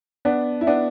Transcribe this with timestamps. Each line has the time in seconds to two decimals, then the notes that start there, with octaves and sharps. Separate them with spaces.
0.25 B3 D4
0.61 E4
0.67 B3 D4